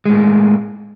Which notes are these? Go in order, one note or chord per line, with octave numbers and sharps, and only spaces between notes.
A2 G#3 A#3